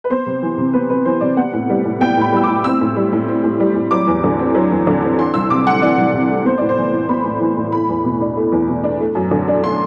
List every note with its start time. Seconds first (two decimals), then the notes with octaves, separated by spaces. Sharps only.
0.04 B4
0.10 B3 C5
0.26 C3
0.42 E3
0.58 C3
0.73 B3 B4
0.90 C3 B4
1.05 E3 C5
1.21 C3 D5
1.37 B3 F#5
1.53 A2
1.69 G3
1.85 A2
2.00 B3 G5
2.17 A2 B5
2.32 G3 E6
2.43 A2 D6
2.64 C4 E6
2.81 A2
2.96 G3
3.12 A2
3.28 C4
3.43 A2
3.60 G3
3.75 A2
3.91 F#3 D6
4.07 E2
4.24 D3
4.39 C4
4.55 F#3
4.71 E2
4.87 D3
5.03 C4
5.19 E3 C6
5.34 C2 E6
5.50 C3 D6
5.66 A3 F#5
5.82 E3 D5
5.98 C2
6.14 C3
6.30 A3
6.45 B3 C5
6.58 A2 D5
6.69 C5
6.78 E3
6.93 A2
7.09 B3 B5
7.24 A2
7.40 E3
7.57 A2
7.72 A3 B5
7.89 E2
8.05 B2
8.21 D4
8.37 A3
8.52 E2
8.68 B2
8.84 D4
9.00 A3
9.15 F#2
9.31 D3
9.48 D4
9.64 A3 C6